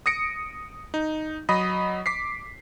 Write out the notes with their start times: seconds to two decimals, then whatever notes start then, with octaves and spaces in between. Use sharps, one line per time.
0.06 D#6 A#6 C#7 D7
0.94 D#4
1.49 F#3 D#5 B5 D#6 A#6
2.06 D6 B6 C7